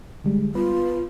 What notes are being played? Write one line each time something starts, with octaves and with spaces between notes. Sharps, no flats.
D3 G3 G#3
B3 F4 B4